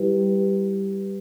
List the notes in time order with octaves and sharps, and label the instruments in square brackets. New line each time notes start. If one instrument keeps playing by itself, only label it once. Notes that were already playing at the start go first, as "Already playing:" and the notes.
Already playing: [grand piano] G3 E4 G4 B4